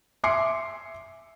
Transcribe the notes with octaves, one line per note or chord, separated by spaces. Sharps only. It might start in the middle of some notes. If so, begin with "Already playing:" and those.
E5 G#5 C6 D6 C7 C#7